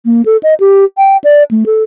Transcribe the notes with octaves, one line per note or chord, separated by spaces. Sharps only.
A#3
A4
D#5
G4
G5
D5
A3
A4